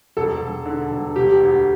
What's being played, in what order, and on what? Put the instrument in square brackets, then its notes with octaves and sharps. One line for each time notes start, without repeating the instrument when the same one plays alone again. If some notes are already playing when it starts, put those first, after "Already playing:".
[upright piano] E1 [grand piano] A4
[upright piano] E1
D3
E1
[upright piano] E1 [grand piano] G4
[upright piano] D2